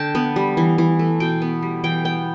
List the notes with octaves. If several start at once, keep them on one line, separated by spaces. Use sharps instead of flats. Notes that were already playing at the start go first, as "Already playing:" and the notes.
Already playing: D3 G5 A5
B3
G3
E3
E3
A3
B2 G5
B3
G3
E3 G5
B3 G5